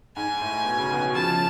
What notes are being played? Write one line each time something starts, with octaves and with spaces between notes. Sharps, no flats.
G#2 G#5
A2
B2
C#3
G#2 B2
C#3 F3 A5